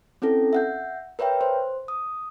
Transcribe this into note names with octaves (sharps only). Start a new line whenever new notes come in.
C4 C#4 E4 A4
E5 F#5 G6
A#4 B4 C#5 E5 G5
C5
D#6